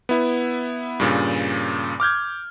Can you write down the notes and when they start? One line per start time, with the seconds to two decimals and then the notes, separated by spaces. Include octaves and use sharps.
0.09 B3 E4
1.00 G2 A#2 C#3
2.00 D6 F6 G6 G#6